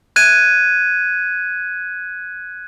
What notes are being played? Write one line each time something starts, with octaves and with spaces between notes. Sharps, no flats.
F#6 G#6 D#7